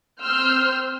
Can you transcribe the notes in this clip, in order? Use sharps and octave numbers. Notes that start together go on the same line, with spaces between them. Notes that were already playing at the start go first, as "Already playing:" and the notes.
C4 C6 E6 F6 G6